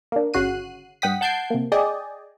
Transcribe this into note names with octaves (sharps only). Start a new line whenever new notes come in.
A#3 D4
G1 C#3 F#4 F#6 C7 D#7
G2 F#5 G5 D#6 B6
F#5 A5 G6 G#6 C7 D7
C3 A#3
G#4 D5 D#5 G5 G#5